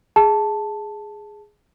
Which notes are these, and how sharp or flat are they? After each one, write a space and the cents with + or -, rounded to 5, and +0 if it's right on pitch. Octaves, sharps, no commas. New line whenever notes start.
G#4 +0 A5 +0